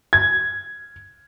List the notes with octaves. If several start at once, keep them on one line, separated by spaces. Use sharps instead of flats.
G#6